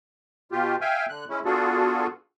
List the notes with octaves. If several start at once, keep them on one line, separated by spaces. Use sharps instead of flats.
B2 F4 G4
E5 F5 G5 G#5
D3 F#6
G#3 C#4 E4
B3 D4 F4 F#4 G#4 A4